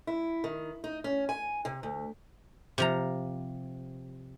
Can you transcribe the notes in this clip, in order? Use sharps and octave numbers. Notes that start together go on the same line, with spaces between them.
E4
D#3
D#4
C#4
G#5
C3
D2
C3 F3 A#5